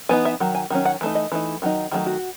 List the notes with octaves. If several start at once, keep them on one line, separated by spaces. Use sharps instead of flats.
E3 B3 D#4 G#5
E5
D#3 F#3
G#5
D#3 F#3 C#4
F#5
E3 A3 D#4
D#5
E3 A3 D#4
D#3 F#3 D#4
D#3 F#3 A3 D#4 G#4
F#4